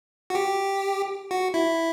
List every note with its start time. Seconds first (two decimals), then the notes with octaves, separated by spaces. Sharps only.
0.30 F#4
0.35 G4
1.31 F#4
1.54 E4